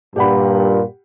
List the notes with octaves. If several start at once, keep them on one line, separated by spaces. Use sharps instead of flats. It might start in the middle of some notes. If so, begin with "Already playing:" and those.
G2 A#2 G4 F#5 B5